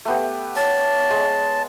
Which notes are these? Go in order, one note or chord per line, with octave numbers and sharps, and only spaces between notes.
A3 B3 G4
C#5 A5
G#3